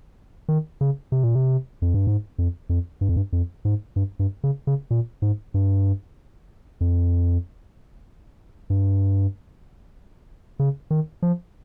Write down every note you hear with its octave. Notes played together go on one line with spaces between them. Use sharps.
D#3
C#3
C3
A#2
C3
F2
G2
G#2
F2
F2
G2
F2
G2
F2
G#2
G2
G2
C#3
C#3
A#2
G#2
G2
F2
G2
C#3
D#3
F3